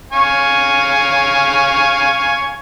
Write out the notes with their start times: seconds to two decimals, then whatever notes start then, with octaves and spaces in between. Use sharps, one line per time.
0.13 F5 G#5 C#6